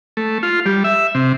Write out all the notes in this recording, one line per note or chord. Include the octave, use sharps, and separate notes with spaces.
A3
F4
G3
E5
C3